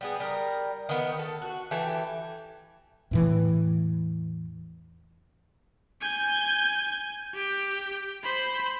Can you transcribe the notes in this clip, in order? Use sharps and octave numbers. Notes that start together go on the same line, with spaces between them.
G3 B3 G#4
G3 A#4
D#3 B3
A4
F#4
E3 G4 A4 G#5
E2 A2 E3
G#5 G6
G4 G5
C5 B5